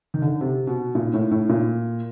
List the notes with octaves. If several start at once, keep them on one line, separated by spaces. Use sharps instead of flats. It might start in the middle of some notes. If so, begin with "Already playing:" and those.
D#3
D3
C3
B2
A#2
A2
A2
A#2